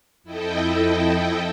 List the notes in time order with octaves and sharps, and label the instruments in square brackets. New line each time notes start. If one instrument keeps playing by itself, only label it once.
[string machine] F2 E4 A4 D#5 G5